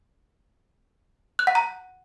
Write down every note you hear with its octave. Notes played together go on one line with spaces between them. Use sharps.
F#6
F#5
A#5